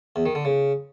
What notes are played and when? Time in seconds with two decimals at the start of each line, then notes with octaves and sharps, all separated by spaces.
0.16 E2
0.26 D#3
0.35 D3
0.45 C#3